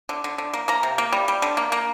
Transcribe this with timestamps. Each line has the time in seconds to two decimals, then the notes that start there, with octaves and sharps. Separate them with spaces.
0.09 D3
0.24 D3
0.38 D3
0.53 A#3
0.68 A#3 A#5
0.83 C3
0.98 A#3
1.12 G3
1.28 G3
1.42 D3
1.57 A#3
1.72 A#3